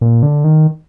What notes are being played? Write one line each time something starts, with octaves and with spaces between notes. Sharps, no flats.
A#2
D3
D#3